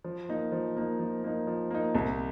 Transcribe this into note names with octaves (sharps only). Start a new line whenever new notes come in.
F3
A#3 D#4
F3
A#3 D#4
F3
A#3 D#4
F3
A#3 D#4
C2